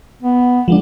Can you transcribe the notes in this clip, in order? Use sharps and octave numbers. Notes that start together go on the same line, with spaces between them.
B3
F3 G#3 D4